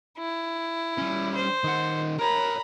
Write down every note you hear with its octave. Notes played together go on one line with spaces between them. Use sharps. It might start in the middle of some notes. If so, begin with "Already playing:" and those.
E4
G3 C#4
C5
D#3 F#5
A#4 C#5 A#5 B5